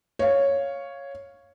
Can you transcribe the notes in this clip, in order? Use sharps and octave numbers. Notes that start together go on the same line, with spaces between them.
C#5 F5